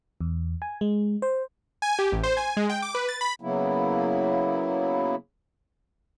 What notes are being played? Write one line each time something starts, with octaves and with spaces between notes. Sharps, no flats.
E2
G#5
G#3
C5
G#5
G4
A1
C5
G#5
G#3
G5
D6
B4
A6
B5
C#3 F#3 A#3 B3 E4